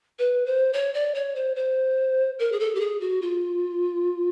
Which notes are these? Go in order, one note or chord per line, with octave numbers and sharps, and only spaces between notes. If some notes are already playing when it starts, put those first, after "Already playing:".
B4
C5
C#5
D5
C#5
C5
C5
A#4
G#4
A4
G4
G#4
F#4
F4